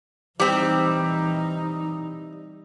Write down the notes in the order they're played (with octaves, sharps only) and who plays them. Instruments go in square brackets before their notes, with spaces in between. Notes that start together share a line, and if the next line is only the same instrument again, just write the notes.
[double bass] E3 D#4 [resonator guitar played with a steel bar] G3 C4